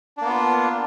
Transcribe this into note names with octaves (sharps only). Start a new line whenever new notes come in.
A#3 B3 D4 F4